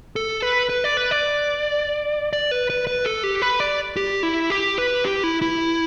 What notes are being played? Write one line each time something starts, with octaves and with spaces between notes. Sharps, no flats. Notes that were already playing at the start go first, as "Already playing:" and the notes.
A4
B4
B4
D5
B4
D5
D5
B4
B4
B4
A4
G4
B4
D5
G4
E4
G4
B4
G4
E4
E4